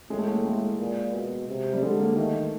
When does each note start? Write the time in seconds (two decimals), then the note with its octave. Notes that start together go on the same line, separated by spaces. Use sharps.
0.10 A2 G#3
0.18 A3
0.28 A#3
0.35 A3
0.45 G#3
0.79 A#2
1.13 B2
1.49 C3
1.73 G3
1.82 D3 G#3
1.99 A#3
2.16 D#3 A3